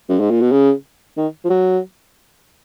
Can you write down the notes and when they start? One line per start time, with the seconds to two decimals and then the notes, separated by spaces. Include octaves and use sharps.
0.09 F#2
0.20 G#2
0.30 A#2
0.41 B2
0.51 C#3
1.17 D#3
1.44 F3
1.50 F#3